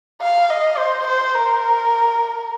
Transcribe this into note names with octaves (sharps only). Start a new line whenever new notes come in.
F5
D#5
C5
C5
A#4